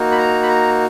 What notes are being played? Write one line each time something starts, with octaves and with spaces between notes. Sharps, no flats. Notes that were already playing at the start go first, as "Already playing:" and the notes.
Already playing: A#3 D#4 F#4
B5
A#5
B5
A#5